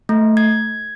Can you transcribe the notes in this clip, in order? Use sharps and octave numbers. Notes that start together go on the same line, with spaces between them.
A3
G#6